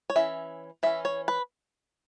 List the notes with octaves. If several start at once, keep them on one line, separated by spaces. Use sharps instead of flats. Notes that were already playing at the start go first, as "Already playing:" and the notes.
C#5
E3 C#4 E5
E3 C#4 E5
C#5
B4